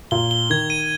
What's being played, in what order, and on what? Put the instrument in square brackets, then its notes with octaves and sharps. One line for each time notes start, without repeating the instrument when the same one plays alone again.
[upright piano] A#2 [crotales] G7
[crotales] G7
[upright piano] D#3 [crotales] G#6
[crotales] D#7